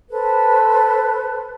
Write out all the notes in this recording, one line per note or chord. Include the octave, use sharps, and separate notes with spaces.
A4 B4 C5